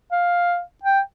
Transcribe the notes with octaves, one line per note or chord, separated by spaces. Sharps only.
F5
G5